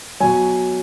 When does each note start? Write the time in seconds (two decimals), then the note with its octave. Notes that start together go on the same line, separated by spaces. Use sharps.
0.20 B2 F#3 G#5